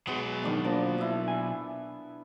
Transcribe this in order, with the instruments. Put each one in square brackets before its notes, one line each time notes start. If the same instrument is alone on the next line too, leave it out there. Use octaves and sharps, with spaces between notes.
[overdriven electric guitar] B2 F#3 [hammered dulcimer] G#3 B3
[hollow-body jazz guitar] F2 A2 D#3 [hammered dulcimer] D4 D5
[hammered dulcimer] F3 [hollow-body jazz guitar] A#3 D4
[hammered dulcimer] B3 E4
[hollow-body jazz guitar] G#5